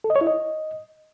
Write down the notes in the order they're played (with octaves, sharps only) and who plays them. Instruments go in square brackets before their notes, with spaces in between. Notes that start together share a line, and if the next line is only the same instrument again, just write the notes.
[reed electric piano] A4
D#5
C#5
E4
D#5